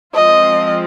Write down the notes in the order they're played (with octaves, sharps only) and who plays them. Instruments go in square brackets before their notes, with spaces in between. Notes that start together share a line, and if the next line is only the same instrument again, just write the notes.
[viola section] F3 G#3 C4 F4 [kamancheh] D#5